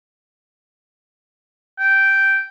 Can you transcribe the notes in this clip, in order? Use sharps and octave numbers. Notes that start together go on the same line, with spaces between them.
G5